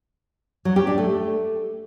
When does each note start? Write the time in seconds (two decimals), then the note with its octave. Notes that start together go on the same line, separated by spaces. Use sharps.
0.65 F#3
0.76 G4
0.87 D4
0.98 A3